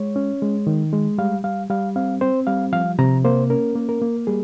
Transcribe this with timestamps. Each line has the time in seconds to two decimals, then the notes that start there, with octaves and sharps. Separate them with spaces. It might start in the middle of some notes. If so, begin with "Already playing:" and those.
Already playing: G#3 C#5
0.16 C#4
0.42 G#3
0.67 D#3
0.93 G#3
1.18 G3 F5
1.44 G3 F5
1.70 G3 F5
1.96 C4 F5
2.21 C4 C5
2.47 G3 F5
2.73 F3 F5
2.99 C3 A#5
3.25 A#3 C5
3.50 C#4 A#4
3.75 A#3
3.89 A#4
4.02 A#3
4.27 G3 G#4